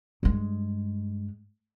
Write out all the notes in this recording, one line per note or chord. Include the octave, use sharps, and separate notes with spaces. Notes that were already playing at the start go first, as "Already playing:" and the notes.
G2 G#3